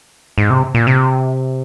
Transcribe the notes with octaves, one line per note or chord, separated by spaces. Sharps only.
G#2
C3
A#2
C3